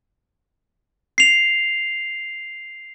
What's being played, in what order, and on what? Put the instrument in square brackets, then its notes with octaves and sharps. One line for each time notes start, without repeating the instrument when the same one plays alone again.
[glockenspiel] C7 F7